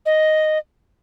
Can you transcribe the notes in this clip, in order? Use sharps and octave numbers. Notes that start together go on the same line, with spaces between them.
D#5